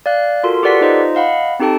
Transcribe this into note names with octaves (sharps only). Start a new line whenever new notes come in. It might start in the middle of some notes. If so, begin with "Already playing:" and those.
D5 F5 F#6
F4 F#4 A4 A#4 C6
G4 A4 B4 D5 F#5 B6
D#4 F4 C5 D#5
D#5 F5 F#5 B5
C4 D#4 G4 A4 G5 A5